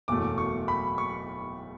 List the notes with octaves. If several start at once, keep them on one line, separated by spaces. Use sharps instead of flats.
F#1 E2 B2 F#3 A3 D6
C#6
B5
C#6